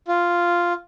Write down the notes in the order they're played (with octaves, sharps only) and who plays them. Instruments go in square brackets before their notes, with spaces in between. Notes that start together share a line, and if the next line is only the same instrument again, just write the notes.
[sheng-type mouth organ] F4